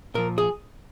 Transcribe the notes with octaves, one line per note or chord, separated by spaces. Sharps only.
A#2 F3 A#4
G#4